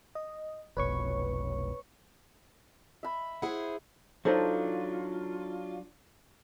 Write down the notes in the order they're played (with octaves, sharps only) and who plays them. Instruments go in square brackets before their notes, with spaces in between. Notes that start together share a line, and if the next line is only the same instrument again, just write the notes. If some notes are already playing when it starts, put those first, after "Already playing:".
[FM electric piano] D#5
[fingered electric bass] F1 B1 [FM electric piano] B4 C#5 C#6
[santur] E5 B5
[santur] E4 [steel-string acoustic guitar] G#4 C5 F#5
[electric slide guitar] F#3 D4 F4 [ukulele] D#4 A4 C5